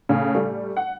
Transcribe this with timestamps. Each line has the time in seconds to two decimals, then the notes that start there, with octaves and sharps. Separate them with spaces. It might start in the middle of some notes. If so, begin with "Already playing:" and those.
0.09 A2 C#3
0.35 G3 A3
0.77 F#5